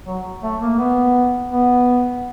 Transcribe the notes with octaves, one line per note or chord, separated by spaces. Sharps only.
F#3
A3
A#3
B3
B3